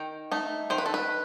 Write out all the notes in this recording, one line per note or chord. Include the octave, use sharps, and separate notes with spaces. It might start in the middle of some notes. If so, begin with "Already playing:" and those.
Already playing: D#3 G5
A3 D#4
D#3 C5
B4
A4
B4